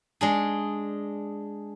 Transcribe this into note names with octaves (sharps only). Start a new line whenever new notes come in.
G#3 D4 G#4